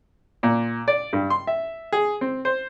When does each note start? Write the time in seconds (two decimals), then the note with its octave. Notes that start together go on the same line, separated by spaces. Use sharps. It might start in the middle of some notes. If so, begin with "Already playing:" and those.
0.43 A#2
0.88 D5
1.13 G2
1.30 C6
1.47 E5
1.92 G#4
2.21 C4
2.45 C5